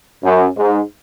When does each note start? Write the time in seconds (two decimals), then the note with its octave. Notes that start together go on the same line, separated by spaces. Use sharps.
0.23 F#2
0.57 G#2